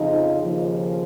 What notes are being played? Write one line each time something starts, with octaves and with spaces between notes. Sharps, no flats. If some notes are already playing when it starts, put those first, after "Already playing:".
Already playing: F2 C#3 F3 D#4
D#2 C#3 F3